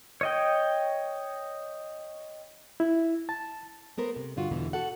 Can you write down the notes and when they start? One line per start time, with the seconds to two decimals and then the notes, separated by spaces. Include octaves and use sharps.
0.21 C#5 D#5 G5
2.80 E4
3.29 A5
3.98 A3 B3 A#4 C5
4.16 C3
4.36 G2 D3 F4 F#4
4.51 E2 B2 D3 E3
4.73 F#4 A4 F#5